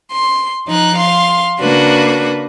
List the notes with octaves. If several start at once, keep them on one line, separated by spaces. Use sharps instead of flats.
C6
F3 D#4 F#6
F5 C6
C#3 A#3 D4 F#4 B4